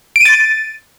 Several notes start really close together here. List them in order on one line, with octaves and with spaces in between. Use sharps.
D7 D#7 A6